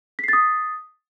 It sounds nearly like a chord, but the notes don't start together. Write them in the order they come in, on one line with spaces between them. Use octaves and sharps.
B6 C7 A6 D#6